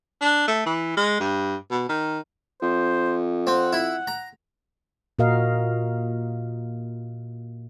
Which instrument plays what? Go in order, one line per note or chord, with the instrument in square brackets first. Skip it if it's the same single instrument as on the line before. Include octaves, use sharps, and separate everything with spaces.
[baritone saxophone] D4
A3
E3
G#3
G2
B2
D#3
[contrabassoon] F2 [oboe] C5
[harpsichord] C4 [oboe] F#5
[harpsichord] E4
A#5
[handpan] A#2 A#3 F#4 A#4 D#5 F5